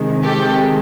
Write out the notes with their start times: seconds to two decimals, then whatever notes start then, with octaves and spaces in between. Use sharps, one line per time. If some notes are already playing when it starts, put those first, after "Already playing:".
Already playing: C3 D#3 G#3
0.25 G4 A4